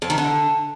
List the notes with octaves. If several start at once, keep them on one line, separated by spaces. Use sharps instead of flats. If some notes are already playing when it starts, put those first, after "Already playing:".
F2
D#3
D3